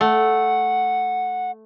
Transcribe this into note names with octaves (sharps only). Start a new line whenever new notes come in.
A3 F#5